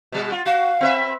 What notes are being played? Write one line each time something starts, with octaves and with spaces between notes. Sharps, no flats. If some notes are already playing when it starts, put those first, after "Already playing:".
B2 G3
F4
F#4 F5
C4 B4 E5